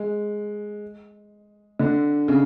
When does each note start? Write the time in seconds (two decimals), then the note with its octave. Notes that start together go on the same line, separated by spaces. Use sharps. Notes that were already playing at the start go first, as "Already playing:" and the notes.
Already playing: G#3
1.79 D3
2.28 C#3